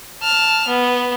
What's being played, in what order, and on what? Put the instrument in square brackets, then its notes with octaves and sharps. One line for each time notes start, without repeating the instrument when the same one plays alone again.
[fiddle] A5 F6
B3